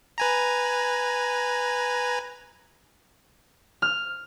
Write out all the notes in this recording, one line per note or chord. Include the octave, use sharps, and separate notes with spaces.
B4 G#5 A#5
F6